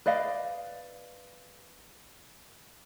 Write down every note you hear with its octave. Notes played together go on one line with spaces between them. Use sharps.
B4 D5 D#5 F5